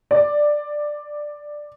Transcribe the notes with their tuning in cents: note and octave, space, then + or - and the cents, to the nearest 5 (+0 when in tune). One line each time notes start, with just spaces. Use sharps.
D5 +5